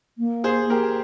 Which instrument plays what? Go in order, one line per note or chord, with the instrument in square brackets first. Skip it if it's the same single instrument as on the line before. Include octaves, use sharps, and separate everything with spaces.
[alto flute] A#3
[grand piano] G#4 C5
G4 A#4